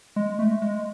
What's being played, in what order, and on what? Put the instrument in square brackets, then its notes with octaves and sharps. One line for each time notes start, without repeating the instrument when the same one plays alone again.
[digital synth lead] G#3
A3
G#3